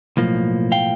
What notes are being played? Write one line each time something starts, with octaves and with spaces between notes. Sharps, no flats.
B1 A2 F3 A#3
F5 G5